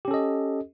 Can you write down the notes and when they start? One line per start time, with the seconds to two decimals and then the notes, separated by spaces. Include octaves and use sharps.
0.05 G4
0.08 C#4
0.11 A4
0.14 D#5